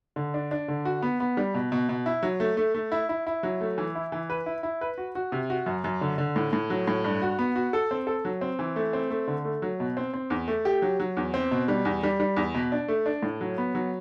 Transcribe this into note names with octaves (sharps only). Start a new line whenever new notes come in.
D3
D4
D4
D3
F#4
B3
B3
G3
B2
B2
B2
E4
F#3
A3
A3
A3
E4
E4
E4
F#3
A3
E3
E4
E3
B4
E4
E4
B4
F#4
F#4
C3
F#4
F#2
F#2
D3
D3
A2
A2
F#3
A2
G2
F#4
B3
F#4
A4
C4
A4
F#3
C4
E3
A3
C4
A3
D3
A3
F#3
B2
C4
C4
E2
A3
G4
F#3
F#3
E2
C4
B2
G3
E2
G3
G3
E2
B2
D4
A3
D4
A2
F#3
B3
F#3